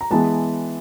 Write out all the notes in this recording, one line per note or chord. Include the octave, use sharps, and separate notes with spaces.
A#5
E3 G#3 B3 A5